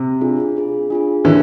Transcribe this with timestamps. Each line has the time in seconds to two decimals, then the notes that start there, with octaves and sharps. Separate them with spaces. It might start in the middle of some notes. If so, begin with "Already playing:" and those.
Already playing: C3
0.21 D4 F4 G#4
0.55 D4 F4 G#4
0.90 D4 F4 G#4
1.24 D3 E3 F#4 A#4 C#5